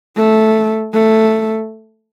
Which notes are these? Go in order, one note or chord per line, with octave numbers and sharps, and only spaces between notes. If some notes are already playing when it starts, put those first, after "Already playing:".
A3
A3